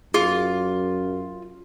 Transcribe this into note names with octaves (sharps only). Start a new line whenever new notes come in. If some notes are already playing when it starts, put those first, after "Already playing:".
F#2 F4 G#4